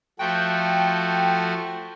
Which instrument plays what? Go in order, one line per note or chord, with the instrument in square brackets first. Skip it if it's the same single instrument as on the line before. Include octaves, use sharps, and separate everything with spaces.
[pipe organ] F3 A3 F#4 [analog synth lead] G5